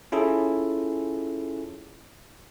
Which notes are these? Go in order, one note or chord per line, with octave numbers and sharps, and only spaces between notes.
C#4 E4 F4 G#4 A4